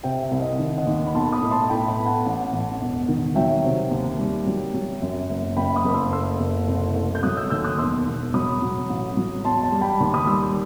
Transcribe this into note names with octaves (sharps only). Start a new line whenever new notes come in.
C3 E5 G5
E5
C2
D#5
D#3
D#5 F#5
D#2
B5
B1 A5 C6
B5 D#6
A2
A5 C6
A2 G5 B5
G5 B5
B3
F#5 A5
A1
A1
E1
D#3
F#3 E5 G5
C3
D#2
G3
F#3
F#3
F#2
F#1
F#1 G5 B5
B5 D#6
F#1
C6 E6
A3 C6 E6
F#1
C2
A3
G6
F#3 D#6 F#6
E6 G6
D#2 E6 G6
D#6 F#6
E1 C6 E6
E1
F#3 B5 D#6
F#3
A1
F#3
E2 A5 C6
A5 C6
G3
G5 B5
D#2
B5 D#6
G3 C6 E6